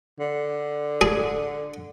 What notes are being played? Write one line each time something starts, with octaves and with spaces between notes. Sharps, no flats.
D3
G#4